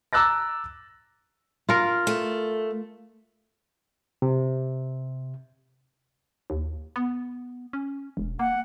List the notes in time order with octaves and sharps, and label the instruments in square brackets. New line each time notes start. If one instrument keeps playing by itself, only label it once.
[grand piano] A#5 D6 E6 F#6 A6 A#6
[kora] F4 A#4
[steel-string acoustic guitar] A3
[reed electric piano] C3
[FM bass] D#2
B3
C#4
E1
[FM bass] A#3 [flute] F#5